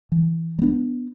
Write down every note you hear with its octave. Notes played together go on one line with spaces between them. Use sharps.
E3
G3
B3 D4